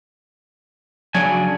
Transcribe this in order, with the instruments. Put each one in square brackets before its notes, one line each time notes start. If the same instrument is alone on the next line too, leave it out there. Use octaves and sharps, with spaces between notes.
[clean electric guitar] C#3 D4 G#5 [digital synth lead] F#3